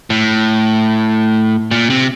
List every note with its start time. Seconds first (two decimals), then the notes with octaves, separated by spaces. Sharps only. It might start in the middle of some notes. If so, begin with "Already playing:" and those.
0.10 A2
1.71 A#2
1.90 C3